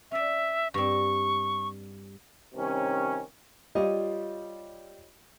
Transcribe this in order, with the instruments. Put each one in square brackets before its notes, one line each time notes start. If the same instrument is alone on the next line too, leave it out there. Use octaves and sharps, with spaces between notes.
[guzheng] C#4 D5 [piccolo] E5
[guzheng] G2 C4 [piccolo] C#6
[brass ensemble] C2 C3 D#3 C#4
[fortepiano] G3 [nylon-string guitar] F4 C#5 D#5